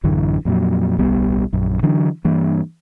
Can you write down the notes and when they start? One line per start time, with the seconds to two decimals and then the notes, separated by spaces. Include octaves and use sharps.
0.04 A1 F#2 D3 E3
0.45 F2 A#2 F#3
0.98 D1 B1 G3 B3
1.53 A#1 F#2
1.83 D3 E3 F#3 D4
2.25 G2 E3 A#3